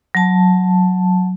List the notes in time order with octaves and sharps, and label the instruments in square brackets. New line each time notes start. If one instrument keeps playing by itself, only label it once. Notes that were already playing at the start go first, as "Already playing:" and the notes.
[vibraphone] F#3 A5